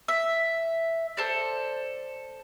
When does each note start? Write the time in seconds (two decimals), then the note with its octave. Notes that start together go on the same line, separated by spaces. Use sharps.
0.08 E5
1.17 A4 C5 D5